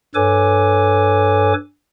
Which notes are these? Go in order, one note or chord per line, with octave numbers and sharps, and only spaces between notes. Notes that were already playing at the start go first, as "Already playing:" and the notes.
G2 A4 B4 C#5 G#5 D6